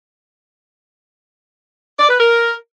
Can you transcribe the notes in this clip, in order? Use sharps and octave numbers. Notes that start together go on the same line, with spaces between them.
D5
B4
A#4